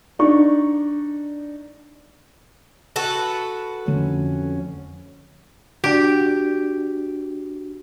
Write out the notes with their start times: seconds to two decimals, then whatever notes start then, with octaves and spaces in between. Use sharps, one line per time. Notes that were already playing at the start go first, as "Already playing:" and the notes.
0.19 D4 D#4 C#6
2.96 F#4 A4 B4
3.88 F2 D3 A3 C#4
5.84 D4 F#4 G4